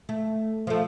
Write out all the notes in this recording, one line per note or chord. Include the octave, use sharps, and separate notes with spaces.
A3
F3 A3